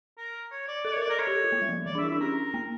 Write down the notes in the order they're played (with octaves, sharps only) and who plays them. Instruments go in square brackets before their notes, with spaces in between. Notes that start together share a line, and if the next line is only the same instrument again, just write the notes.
[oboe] A#4
C#5
D5
[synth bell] A4 [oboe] D5
[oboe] C#5
[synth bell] A#4
[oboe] D5
[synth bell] A4 [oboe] A#4
[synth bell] A4 [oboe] C#5
[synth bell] G4
A4
F4
A#3
G3
F3
[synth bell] E3 [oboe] D5
[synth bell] D4
[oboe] E5
[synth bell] E4
[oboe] E5
[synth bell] D4
[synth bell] C#4 [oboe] A#4
[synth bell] A#3